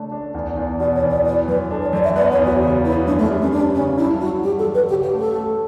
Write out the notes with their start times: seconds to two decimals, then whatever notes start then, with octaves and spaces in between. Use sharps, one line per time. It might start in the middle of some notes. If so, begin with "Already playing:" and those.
Already playing: C#3 A3 D4
0.12 D4
0.34 E2
0.57 E2
0.80 B2 D5
0.96 C#5
1.02 E2
1.10 D5
1.25 E3 D5
1.48 F#2 B4
1.71 D4 A4
1.82 C#5
1.93 F#2 D5
2.04 E5
2.16 B3 D5
2.32 C#5
2.39 E2
2.46 F#4
2.62 C#3 F#4
2.85 B3 E4
3.07 F#2 D4
3.18 A3
3.30 G3
3.42 C#4
3.52 G3 D4
3.75 C#3 C#4
3.98 G2 E4
4.21 F#3 F#4
4.43 G2 G4
4.59 A4
4.66 F#3
4.75 B4
4.89 C#3 G4
5.04 G4
5.12 A3
5.20 A4
5.35 A3